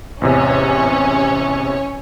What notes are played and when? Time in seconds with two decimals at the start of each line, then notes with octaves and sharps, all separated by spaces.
0.21 A1 E2 C3 C#4 C#5